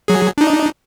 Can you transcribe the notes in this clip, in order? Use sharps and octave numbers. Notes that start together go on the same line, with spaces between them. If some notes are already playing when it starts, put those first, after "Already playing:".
F#3 G#4
D4 D#4